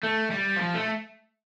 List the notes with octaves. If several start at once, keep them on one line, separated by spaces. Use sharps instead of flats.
A3
G3
F3
A3